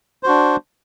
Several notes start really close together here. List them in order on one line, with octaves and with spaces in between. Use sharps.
C5 F#4 D4